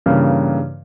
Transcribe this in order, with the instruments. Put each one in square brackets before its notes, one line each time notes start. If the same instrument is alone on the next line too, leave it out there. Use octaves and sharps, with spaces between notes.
[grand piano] G2 C#3 E3 A#3